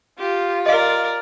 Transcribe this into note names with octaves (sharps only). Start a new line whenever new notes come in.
F4 G4
A#4 D5 D#5 F5